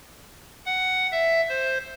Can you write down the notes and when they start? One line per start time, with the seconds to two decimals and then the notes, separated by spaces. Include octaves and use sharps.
0.66 F#5
1.12 E5
1.49 C5